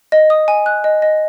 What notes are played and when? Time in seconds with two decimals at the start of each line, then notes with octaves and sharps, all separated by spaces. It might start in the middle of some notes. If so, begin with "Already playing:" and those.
0.12 D#5
0.30 D#6
0.48 G#5
0.66 F#6
0.84 D#5
1.02 D#5